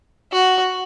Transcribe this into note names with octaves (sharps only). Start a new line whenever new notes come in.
F#4